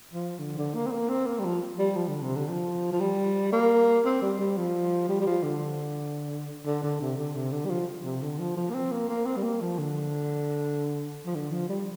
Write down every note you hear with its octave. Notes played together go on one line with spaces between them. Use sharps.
F3
D3
D3
A#3
C4
A#3
C4
A#3
G3
F3
G3
F3
D3
C3
D3
F3
F3
G3
A#3
C4
G3
G3
F3
G3
G3
F3
D3
D3
D3
C3
D3
C3
D3
G3
F3
C3
D3
F3
F3
A#3
C4
A#3
A#3
C4
G3
A#3
F3
D3
F3
D3
F3
G3